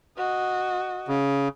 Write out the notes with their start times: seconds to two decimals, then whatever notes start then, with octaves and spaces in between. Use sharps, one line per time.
0.17 F#4 D#5
1.08 C#3